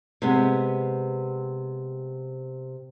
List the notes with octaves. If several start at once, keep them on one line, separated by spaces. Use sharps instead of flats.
C3 G#3 B3